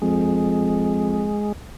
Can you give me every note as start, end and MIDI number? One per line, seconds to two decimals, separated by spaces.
0.02 1.32 41
0.02 1.52 56